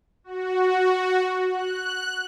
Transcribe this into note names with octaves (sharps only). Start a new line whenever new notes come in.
F#4
F#6